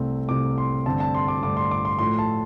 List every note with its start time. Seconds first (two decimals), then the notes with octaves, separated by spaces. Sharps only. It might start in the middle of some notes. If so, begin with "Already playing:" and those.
Already playing: C2 C3 A3 C4
0.29 C2 C3 A3 C4 D6
0.58 C6
0.86 G2 D3 A3 C4 A5
1.00 A5
1.14 C6
1.28 D6
1.42 G2 D3 A3 C4 D6
1.57 C6
1.71 D6
1.85 C6
1.99 A2 F3 A3 C6
2.19 A5